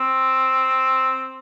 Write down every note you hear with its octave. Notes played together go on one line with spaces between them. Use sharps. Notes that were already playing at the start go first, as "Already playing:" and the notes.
Already playing: C4